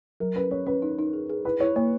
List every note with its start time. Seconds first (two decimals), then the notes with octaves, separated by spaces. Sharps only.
0.20 F#3 A#4
0.35 C#4 B4
0.51 C#4 C#5
0.67 C#4 B4
0.82 D#4
0.99 D#4
1.13 G#4
1.29 G#4
1.45 E4 B4
1.60 E4 C#5
1.76 A#3 C#5